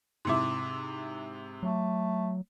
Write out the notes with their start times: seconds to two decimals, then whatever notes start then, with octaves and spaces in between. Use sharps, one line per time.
0.25 G#2 C3 E4 C6 D6
1.63 F#3 A3